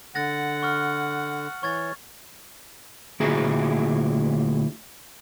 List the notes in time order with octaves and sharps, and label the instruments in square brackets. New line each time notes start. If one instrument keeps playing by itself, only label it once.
[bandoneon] D3 [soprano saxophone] F#5 [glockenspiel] F#6 A6 A#6
[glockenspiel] C#6 F6
[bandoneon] E3 C#5 [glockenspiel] C#6 G#6 A6
[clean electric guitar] D2 A#2 E4 F#4 G#4 A#5